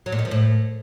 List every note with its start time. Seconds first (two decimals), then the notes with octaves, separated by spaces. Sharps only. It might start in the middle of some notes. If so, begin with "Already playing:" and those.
0.06 F#3
0.12 A#2
0.19 D#3
0.25 F3
0.31 A2